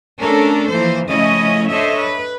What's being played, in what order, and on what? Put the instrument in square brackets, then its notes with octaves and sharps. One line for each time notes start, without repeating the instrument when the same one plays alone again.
[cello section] A3 C#4 D4 A4 A#4
E3 F3 A#3 C5
C#3 F3 A3 C#4 E4 D#5
D4 A4 C5 C#5 D#5 E5
B4